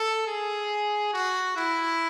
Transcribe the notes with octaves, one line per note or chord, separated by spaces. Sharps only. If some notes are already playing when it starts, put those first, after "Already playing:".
Already playing: A4
G#4
F#4
E4